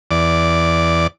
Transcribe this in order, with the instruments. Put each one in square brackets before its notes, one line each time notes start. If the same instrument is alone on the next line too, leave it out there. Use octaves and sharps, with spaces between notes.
[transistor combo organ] E2 D5